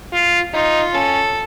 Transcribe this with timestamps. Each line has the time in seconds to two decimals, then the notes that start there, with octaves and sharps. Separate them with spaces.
0.13 F4
0.54 D#4 F4
0.94 C#4 A4